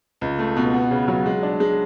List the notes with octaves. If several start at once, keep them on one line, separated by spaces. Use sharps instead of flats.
C#2
A3
B2
B3
C#3
F#3
G#3
D4
G#3